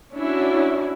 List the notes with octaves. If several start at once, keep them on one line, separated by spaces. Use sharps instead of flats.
C#4 D4 E4 F#4